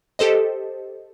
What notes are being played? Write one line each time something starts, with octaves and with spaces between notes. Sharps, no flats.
G4 A4 C5 D#5